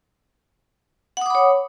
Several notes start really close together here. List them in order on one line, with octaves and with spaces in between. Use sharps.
F#5 D#6 D6 B5 C#5